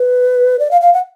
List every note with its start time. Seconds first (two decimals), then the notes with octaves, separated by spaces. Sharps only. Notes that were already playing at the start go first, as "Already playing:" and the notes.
Already playing: B4
0.59 D5
0.71 F5
0.81 F5
0.94 F#5